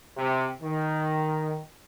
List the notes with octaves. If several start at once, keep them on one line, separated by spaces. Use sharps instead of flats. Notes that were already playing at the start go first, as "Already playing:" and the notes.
C3
D#3